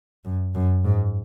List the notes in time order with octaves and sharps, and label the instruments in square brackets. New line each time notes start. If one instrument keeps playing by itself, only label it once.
[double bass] F#2
F#2
G#2